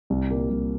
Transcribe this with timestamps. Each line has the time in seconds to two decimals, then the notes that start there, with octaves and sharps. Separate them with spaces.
0.10 C2
0.30 A#2 G3 A#3
0.50 C2